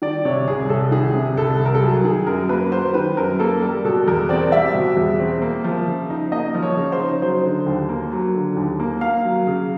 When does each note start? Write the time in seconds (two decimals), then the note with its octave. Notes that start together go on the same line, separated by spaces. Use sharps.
0.02 D#3 D5
0.25 C3 C#5
0.47 C2 G#4
0.70 C2 A4
0.92 D#3 G#4
1.15 C3
1.37 C2 A4
1.60 C2
1.66 A#4
1.75 A4
1.82 F#3 G#4
2.04 D#3 G#4
2.27 F#2 A#4
2.49 A#3 B4
2.72 F#3 C5
2.94 D#3 B4
3.17 F#2 A#4
3.40 A#3 A4
3.62 G3 A#4
3.84 B2 A4
4.07 E2 A#4
4.29 C4 D5
4.52 G3 E5
4.75 B2
4.96 E2
5.20 C4
5.42 A#3
5.64 F3
5.87 C#3
6.10 D#4
6.32 A#3 D#5
6.54 F3
6.63 C#5
6.77 C#3
6.92 C5
7.00 D#4
7.22 F#3 C5
7.45 D3
7.66 D#2
7.89 A#3
8.12 F#3
8.34 D3
8.56 D#2
8.80 A#3
9.01 A#3 F5
9.25 F#3
9.47 C#3